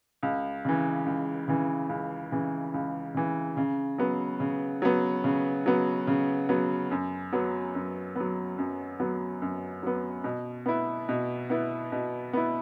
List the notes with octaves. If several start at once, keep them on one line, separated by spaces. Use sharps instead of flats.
C#2
C#3 E3
C#2
C#3 E3
C#2
C#3 E3
C#2
C#3 E3
C#3
F#3 B3
C#3
F#3 B3
C#3
F#3 B3
C#3
F#3 B3
F#2
F#3 B3
F#2
F#3 B3
F#2
F#3 B3
F#2
F#3 B3
B2
B3 E4
B2
B3 E4
B2
B3 E4